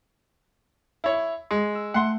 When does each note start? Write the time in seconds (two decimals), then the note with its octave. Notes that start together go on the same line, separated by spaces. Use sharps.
1.04 E4 C#5
1.51 G#3
1.75 E6
1.94 A3 F#5 C6